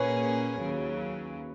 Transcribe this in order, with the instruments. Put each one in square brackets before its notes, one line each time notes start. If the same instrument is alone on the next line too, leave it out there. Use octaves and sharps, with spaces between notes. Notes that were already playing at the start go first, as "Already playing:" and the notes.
Already playing: [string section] A#2 A#3 C#4 G#4 [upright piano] B4 C#5
[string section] D#2 C#3 F#3